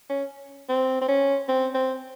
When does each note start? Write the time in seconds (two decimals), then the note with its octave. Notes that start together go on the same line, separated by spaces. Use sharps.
0.09 C#4
0.69 C4
1.01 C4
1.08 C#4
1.48 C4
1.74 C4